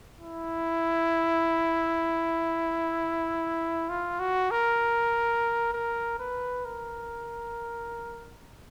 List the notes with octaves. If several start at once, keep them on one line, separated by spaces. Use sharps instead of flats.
E4
F4
F#4
A#4
A#4
B4
A#4